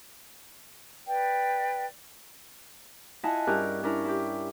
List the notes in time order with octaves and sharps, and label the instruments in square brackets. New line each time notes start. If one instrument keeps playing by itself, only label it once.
[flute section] B4 D5 G5
[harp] E4 F4 D#5 F#5 G#5 A5
G2 C#4 G4 G#4 A#4 F#6
C#4 D4 E4 A#4
E4 G4